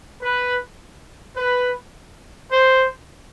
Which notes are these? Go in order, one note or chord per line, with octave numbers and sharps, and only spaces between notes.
B4
B4
C5